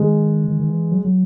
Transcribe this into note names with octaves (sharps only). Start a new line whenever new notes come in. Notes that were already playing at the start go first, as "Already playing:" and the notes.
Already playing: D#3 G#3
D#3
D#3
E3
F#3
F#3